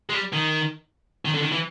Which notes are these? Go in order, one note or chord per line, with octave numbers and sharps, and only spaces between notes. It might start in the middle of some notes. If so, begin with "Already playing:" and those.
G#3
G3
D#3
D#3
D3
D#3
E3